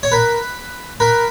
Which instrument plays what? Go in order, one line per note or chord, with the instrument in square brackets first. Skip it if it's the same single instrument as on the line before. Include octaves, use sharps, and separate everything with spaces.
[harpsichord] C#5
[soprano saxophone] A#4 [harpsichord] B4
[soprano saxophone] A#4 [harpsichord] B4